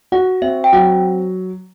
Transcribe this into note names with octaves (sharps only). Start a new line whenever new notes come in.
F#4 F#5
C4 E5
G5
F#3 F#5